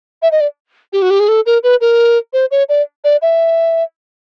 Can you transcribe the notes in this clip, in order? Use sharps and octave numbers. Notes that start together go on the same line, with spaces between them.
E5
D#5
D5
G4
F#4
G4
G#4
A4
A#4
B4
A#4
C5
C#5
D5
D5
E5